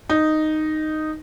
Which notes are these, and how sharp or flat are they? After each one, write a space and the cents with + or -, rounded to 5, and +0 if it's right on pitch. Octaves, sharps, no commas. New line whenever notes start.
D#4 -5